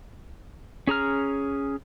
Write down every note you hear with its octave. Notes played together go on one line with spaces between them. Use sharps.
C#4 G#4 A#5 F6